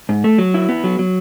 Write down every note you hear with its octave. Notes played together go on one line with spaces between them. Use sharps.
G#2
A3
F#3
E4
B3
F#3
F#3